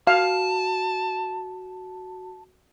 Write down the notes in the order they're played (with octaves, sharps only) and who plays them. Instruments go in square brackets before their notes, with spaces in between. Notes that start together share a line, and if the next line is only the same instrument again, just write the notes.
[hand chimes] F#4 [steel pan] F5 [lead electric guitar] A5